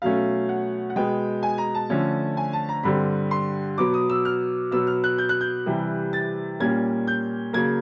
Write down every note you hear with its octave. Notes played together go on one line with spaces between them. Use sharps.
B2 F#3 A3 C#4 F5
F#5
F#5
B2 G#3 B3 G5
G#5
A#5
A5
D3 F3 A3 C#4
G#5
A5
A#5
G2 D3 G3 C4 B5
C6
B2 F#3 B3 D6
D#6
E6
F6
B2 F#3 B3 E6
F6
F#6
G6
F#6
G6
C3 E3 G3
A6
A#2 G3 A#3 C#4 G#6
G6
C#3 F#3 A#3 G#6